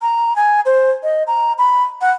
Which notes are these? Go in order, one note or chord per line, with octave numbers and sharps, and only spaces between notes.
A#5
G#5
C5
D#5
A#5
B5
F#5